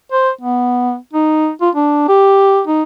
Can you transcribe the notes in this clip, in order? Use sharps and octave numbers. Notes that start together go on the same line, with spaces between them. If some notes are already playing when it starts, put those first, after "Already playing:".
C5
B3
D#4
F4
D4
G4
D#4